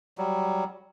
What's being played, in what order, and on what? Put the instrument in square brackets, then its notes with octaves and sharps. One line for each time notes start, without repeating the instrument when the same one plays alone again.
[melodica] F#3 G3